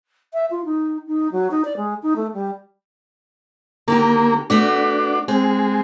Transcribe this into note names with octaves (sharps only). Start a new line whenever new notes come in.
E5
F4
D#4
D#4
F#3
D#4
D5
G#3
D#4
A3
G3
D3 D#3 A#3 G4
A3 B3 D4 F#4
G#3 C4